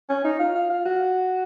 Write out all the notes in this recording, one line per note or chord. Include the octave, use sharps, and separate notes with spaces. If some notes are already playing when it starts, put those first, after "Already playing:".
C#4
D#4
F4
F4
F4
F#4